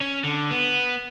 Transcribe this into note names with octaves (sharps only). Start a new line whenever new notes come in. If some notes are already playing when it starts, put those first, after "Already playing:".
C#4
D3
B3